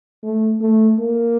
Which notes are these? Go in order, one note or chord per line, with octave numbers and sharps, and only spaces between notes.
A3
A3
A#3